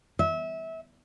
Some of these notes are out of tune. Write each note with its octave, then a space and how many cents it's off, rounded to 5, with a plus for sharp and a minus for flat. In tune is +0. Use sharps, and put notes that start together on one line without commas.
E5 -25